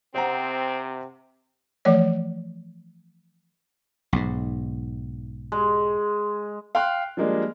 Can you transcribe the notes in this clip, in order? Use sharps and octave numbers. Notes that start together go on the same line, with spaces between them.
C3 C4 C5 F#5 A#5
E3 F3 A3 C#5 D5
B1 G#2
G#3
F5 G5 C6 F6 F#6
F3 G3 G#3 A#3 D4